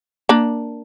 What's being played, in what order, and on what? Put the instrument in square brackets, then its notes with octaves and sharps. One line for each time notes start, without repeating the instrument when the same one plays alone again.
[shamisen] A#3 D4